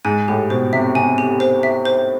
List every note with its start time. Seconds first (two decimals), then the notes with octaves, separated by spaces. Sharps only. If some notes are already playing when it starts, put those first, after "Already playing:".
0.05 G#2 G#5
0.28 A2 G4
0.50 B2 C5
0.73 C3 E5
0.95 C3 G#5
1.18 G4
1.40 C5
1.63 E5
1.85 C5